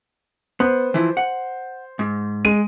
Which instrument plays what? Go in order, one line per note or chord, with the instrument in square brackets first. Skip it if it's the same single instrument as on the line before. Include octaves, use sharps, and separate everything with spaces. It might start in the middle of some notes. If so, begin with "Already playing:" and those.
[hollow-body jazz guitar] B3 [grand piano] C5
[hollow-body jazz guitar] E3 F3 E4
F#5
G#2
[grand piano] G#3 D#7